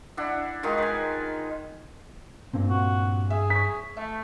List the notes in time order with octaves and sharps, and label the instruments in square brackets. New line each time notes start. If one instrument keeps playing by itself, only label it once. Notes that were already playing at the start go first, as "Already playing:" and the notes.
[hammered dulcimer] D4 E4 F#5
D#3 G#3 D#4 F4
B4 G#5
[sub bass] G2 [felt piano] A#2 C4
[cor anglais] F#4
[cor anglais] G#4 [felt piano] E5
[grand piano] C#6 B6
[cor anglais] A3 [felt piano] E5